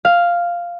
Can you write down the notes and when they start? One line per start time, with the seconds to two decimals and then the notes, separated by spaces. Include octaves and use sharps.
0.05 F5